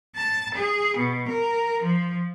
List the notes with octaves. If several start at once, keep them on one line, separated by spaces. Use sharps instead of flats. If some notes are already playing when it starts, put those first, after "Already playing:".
A5
G#4
B2
A#4
F3